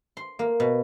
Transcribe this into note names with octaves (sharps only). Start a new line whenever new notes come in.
C6
A#3
B2